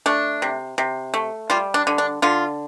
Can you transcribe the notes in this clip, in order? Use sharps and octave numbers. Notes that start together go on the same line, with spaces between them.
A3 D4
C3
C3
A3
G3 F4
D4
D3
D4
D3 F4